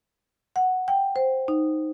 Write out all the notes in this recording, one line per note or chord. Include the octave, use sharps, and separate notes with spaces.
F#5
G5
C5
D#4